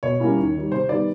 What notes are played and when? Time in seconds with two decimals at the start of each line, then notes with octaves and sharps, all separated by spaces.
0.03 B2 C#5
0.20 G3 A#3 C#4 E4
0.37 D#2
0.55 D#3 G3
0.72 C3 C5
0.89 D#3 G3 B3 D5